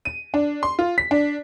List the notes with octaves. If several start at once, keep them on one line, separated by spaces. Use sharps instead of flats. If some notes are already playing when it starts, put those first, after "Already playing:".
D#7
D4
C6
F4
B6
D4